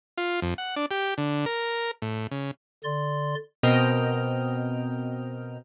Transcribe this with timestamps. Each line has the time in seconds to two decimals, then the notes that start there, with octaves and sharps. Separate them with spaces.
0.18 F4
0.42 F2
0.58 F#5
0.76 D4
0.91 G4
1.18 D3
1.46 A#4
2.02 A2
2.31 C#3
2.84 D3 D5 C6
3.63 B2 C4 A#4 D#5 G5 F6